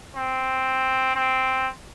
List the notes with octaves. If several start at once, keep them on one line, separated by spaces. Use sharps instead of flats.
C4
C4